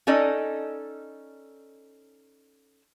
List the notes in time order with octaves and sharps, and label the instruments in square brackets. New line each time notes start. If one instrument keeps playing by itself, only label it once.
[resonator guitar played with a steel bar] C#4 D#4 A4 D5 D#5